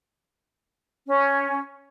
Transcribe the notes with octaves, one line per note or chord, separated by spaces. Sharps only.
C#4